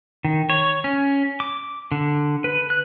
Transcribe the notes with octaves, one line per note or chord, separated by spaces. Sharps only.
D#3
C#5
C#4
D6
D3
B4
F#6